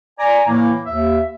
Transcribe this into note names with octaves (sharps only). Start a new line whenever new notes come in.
D5 G#5 A#5
A2 E3 A#3
D#2 E5